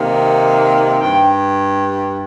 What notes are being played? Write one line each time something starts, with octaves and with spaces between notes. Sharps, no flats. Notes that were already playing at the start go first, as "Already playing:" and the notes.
Already playing: C3 D#3 A#3
G2 G5